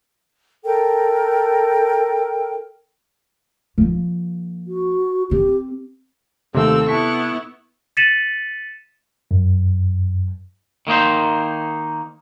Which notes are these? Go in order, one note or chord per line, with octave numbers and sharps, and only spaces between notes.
A4 A#4 G5
F3 A#3
F#4
C4 G4
D#2 C3 D#3 A3 C4 A4 E6
B3 E4 A5 C#6 B6
A6 B6 C#7 D#7 E7 F#7
F#2
D#3 A#3 D#4 C5